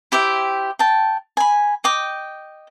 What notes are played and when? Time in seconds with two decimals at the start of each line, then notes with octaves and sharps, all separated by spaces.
0.12 E4 G4 C5 E5
0.79 G5 A5
1.37 G#5 B5
1.84 D#5 G5 D6